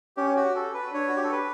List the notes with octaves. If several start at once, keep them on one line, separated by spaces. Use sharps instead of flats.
C#4 G4
F#4
A4
B4
D4 C#5
F#4
G4
A4
B4